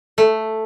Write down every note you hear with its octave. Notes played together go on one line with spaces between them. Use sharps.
A3